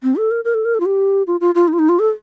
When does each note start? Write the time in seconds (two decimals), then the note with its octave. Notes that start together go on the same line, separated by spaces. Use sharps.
0.03 C4
0.16 A4
0.31 A#4
0.45 A#4
0.54 A4
0.65 A#4
0.75 A4
0.80 F4
0.86 G4
1.27 F4
1.41 F4
1.55 F4
1.68 D#4
1.73 F4
1.79 D#4
1.89 F4
1.99 A4